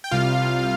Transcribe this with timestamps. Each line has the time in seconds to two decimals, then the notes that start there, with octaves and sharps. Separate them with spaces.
0.04 G5
0.11 C2 C3 G3 F4 F5